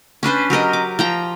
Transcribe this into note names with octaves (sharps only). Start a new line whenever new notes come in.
C#4 D4 B4 C5
F#3 G4 A#4 D#5
D6
F3 G5 A#5